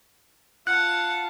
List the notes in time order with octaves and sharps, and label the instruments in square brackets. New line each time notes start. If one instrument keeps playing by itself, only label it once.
[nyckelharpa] F4 A5 [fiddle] F#5 [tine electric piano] F#6